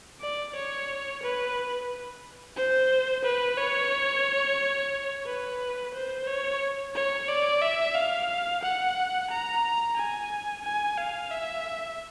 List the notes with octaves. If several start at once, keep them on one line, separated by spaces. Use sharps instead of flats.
D5
C#5
B4
C5
B4
C#5
B4
C5
C#5
C#5
D5
E5
F5
F#5
A#5
G#5
G#5
F5
E5